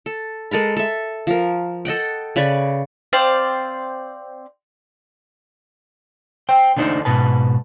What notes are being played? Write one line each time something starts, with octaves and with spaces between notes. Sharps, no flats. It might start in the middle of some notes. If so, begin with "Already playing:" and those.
A4
G#3 A4 A#4 B5
A4 E5
F3 A#4
A4 D#5 F#5 G5
C#3 B4 D5 C#6
C4 C5 D5 F5
C5 G5
D3 A3 D4 D#4 C5
G#2 B2 B4 A5